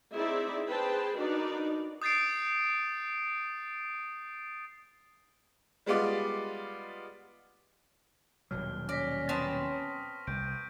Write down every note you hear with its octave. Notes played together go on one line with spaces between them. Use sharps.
C4 D#4 E4 G#4 D5 E5
G#4 B4 C5 G5 A5
D4 D#4 F#4 A#4 B4 D5
D#6 G6 A6 C7 D7
G3 G#3 B3 F4 D5
D#1 B2 F#3 F6
C#4 D5 F6 A#6 B6
B3 C4 A5 C#6 D#6
C2 C#6 G6 D7